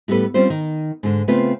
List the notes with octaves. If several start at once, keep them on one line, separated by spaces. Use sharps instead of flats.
A2 G3 B3 A4 B4
G3 C4 C#4 F4 C5
D#3
G#2 D3
C#3 A3 B3 C4 F4 B4